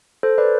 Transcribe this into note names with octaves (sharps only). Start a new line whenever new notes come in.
A4 C5
B4 D5